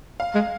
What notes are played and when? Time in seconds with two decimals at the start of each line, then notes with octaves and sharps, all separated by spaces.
0.20 F5
0.35 G#3